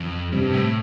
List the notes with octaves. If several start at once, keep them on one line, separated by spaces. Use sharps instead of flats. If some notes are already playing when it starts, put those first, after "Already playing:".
Already playing: F2
G2 C3
A2